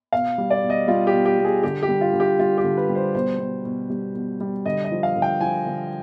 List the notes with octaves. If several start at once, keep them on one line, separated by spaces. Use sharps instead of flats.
B2 F5
G3
D5
B2
D#5
G3 F4
G4
B2
G4
G3
G#4
D3 G4
G4
G3
F4
D3
G4
G3 F4
G4
D3
B4
G3
C5
B2 C5
G3
B2
G3
B2
G3
D3 D#5
D#5
F3
F5
D3
G5
F3 G#5
D3